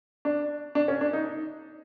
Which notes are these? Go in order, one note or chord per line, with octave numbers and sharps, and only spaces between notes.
D4
D4
C#4
D4
D#4